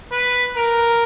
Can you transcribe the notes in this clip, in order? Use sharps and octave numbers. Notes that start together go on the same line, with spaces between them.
B4
A#4